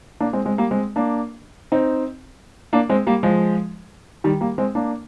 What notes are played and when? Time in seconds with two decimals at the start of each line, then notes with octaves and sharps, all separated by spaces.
0.20 A#3 D4
0.33 G#3 C4
0.45 G#3 C4
0.58 G3 A#3
0.71 G#3 C4
0.96 A#3 D4
1.72 C4 D#4
2.73 A#3 D4
2.89 G#3 C4
3.07 G3 A#3
3.23 F3 G#3
4.24 D#3 G3
4.41 G3 A#3
4.58 G#3 C4
4.75 A#3 D4